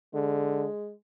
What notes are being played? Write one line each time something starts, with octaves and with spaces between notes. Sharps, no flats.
D3 G#3